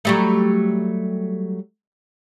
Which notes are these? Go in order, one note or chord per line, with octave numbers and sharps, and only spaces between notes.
F#3 G3 A3